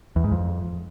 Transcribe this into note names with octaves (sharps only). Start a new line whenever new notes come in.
E2
G#2
F2